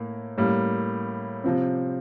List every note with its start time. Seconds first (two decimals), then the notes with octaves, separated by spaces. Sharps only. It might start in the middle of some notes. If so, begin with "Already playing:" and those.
Already playing: A2 A#3
0.37 A2 G3 A#3
1.44 C3 F3 C4